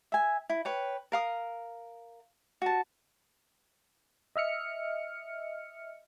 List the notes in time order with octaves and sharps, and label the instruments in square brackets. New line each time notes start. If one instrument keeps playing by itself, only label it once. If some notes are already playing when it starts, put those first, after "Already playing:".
[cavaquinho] E5 G#5
E4
B4 C#5 G5
A#4 F5 D#6
F#4 A5
[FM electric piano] D#5 E5 F6 C#7